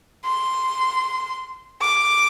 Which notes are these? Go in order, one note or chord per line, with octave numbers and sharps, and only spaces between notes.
C6
D6